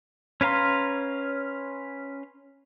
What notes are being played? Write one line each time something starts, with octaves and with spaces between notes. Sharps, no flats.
C#4 B4 F5 A#5 C6